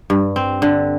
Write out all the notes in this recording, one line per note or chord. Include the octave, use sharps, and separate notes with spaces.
G2
C4
D3